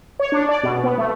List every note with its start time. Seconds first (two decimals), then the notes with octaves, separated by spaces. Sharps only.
0.19 C#5
0.32 D4
0.49 D5
0.63 B2
0.84 B3
0.98 A3